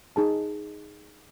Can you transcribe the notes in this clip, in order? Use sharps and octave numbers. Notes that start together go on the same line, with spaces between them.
D#4 G#4 A5